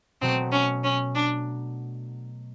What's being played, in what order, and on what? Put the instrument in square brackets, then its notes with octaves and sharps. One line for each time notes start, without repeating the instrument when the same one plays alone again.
[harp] B2 F#3 A3 [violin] C4
[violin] C#4
C#4
D4